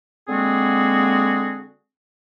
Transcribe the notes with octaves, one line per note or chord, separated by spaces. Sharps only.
D3 G#3 A#3 C4 F#4 G#4